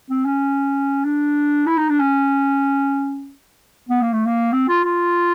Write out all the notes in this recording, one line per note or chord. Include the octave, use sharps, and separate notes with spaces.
C4
C#4
D4
E4
D#4
D4
C#4
B3
A#3
A3
A#3
C4
F4
F4